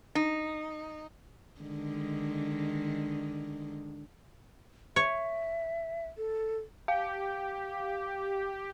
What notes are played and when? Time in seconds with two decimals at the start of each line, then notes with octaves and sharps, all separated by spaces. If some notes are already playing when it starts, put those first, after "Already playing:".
0.15 D#4
1.61 D3 D#3 G#3
4.96 C#5 E5
6.17 A4
6.88 G4 F5